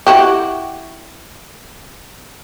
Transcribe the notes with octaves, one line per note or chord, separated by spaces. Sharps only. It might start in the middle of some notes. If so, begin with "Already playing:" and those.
E4 F#4 G4